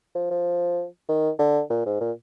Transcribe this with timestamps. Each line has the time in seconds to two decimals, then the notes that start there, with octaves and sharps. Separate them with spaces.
0.15 F3
0.31 F3
1.09 D#3
1.39 D3
1.70 A#2
1.86 G#2
2.01 A#2